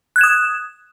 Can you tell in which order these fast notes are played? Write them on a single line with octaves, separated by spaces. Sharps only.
F#6 G#6 E7 D#6